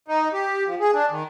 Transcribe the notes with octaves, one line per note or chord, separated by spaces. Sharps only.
D#4
G4
F3
G#4
D4
D#3